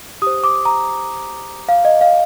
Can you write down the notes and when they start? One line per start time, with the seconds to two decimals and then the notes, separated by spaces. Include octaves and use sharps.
0.22 G4 C5 D#6
0.44 D6
0.65 A#5
1.69 F5
1.85 D#5
2.01 F5